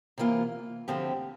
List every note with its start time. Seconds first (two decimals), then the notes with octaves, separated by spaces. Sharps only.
0.18 C3 E3 A#3 F4
0.88 D2 D3 F3 C4 G4